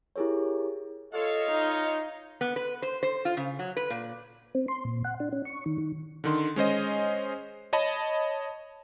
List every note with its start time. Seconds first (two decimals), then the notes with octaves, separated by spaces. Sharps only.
0.16 E4 G4 G#4 A#4 C#5
1.13 F4 A4 C#5 D#5 F5
1.51 D#4
2.41 B3
2.56 B4
2.82 C5
3.03 C5
3.25 F4
3.37 C#3
3.59 F#3
3.77 B4
3.90 A#2
4.55 C4
4.68 C6
4.85 A#2
5.05 F#5
5.20 D4
5.32 C#4
5.45 C#6
5.66 D#3
5.78 D#3
6.24 D3 D#3 C6
6.56 G#3 C#4 C5 D#5
7.73 C#5 D#5 A5 B5